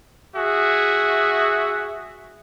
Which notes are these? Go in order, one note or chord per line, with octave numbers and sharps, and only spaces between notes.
F#4 G#4 E5